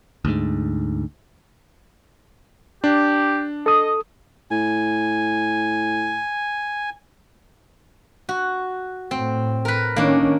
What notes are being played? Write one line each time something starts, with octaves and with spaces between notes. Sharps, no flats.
D2 G#2
D4 G4
A4 D#5 D#6
A2 G#5
F#4
A2 C4
A#4 B4
D#3 A#3 C#4 D4